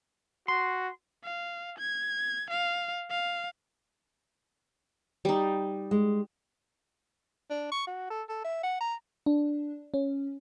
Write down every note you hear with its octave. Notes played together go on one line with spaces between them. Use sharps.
F#4 C6
F5
G#6
F5
F5
G3 D#4
G#3
D4
C#6
F#4
A4
A4
E5
F#5
A#5
D4
C#4